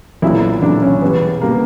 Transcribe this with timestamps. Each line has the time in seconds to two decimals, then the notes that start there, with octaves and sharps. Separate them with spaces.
0.22 B1 A#2 F#3 E4
0.62 B1 A#2 F#3 D4
0.82 C#4
1.02 E2 B2 G3 B3
1.41 B2 G3 A#3